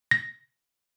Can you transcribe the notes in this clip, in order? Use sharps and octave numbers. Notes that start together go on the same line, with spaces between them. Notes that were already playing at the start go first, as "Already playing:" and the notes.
A#6